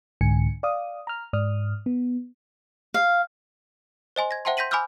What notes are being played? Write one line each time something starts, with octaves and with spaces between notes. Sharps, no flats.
C2 G#2 D3 G#5 C#7
D5 F5 D#6
A#5 F6
G#2 D5 D#6 F6
B3
F5
C5 D#5 G#5 C6
G#6 A#6
C5 E5 F#5 G5 A5 C6
C6 G6 A#6 B6 D#7 F#7
G#5 B5 D6 E6 F6 G6